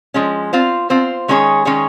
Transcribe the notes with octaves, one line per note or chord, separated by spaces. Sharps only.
F3 G#3 C#4
C4 F4 C5
C4 F4 C5
D#3 G#3 C#4 G#4 C#5
D#3 G#3 C#4 G#4 C#5